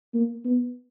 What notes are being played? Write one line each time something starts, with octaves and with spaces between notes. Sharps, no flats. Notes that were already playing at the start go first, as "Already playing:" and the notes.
A#3
B3